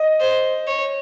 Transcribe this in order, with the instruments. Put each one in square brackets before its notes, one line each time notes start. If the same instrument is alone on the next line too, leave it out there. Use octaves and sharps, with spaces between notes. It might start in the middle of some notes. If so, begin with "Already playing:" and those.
Already playing: [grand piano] D#5
[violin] C5
C#5